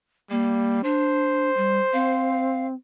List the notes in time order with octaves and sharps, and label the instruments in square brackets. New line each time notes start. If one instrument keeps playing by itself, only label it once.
[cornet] G3 [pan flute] A#3
[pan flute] D4 [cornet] C5
[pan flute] G3
[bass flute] C4 [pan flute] F5